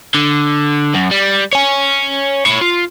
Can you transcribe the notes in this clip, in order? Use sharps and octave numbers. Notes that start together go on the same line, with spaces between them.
D3
F#2
G3
C#5 G#5
E4 C#5
F4